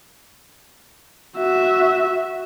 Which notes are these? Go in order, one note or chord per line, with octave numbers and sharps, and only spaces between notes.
F#4 E5